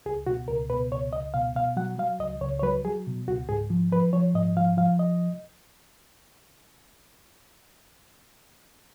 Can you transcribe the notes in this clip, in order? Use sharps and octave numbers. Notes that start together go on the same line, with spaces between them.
C#2 G#4
B2 F#4
C#2 A#4
B2 B4
C#2 C#5
C#2 D#5
B2 F5
B2 F5
F#3 F#5
F#3 F5
C#2 D#5
C#2 C#5
C#5
F#3 B4
F#3 G#4
B2
C#2 F#4
G#2 G#4
F3
F3 B4
F3 C#5
G#2 D#5
F3 F5
F3 F5
D#5